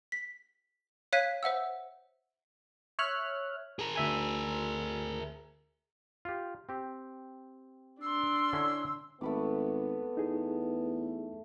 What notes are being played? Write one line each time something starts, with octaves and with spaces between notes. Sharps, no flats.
B6
C#5 F5 F#6 G#6 B6 D#7
C5 E5 F#5 E6
C#5 E5 F6 F#6
G#4 A#4
D2 E5 G#5
F4 G4
C4 G4
D4 C6 E6
D3 C#4 E4
G#1 A3 B3 B5 D6
E2 D#4 G#4